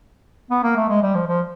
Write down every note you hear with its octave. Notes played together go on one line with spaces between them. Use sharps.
B3
A#3
A3
G#3
G3
F3
F3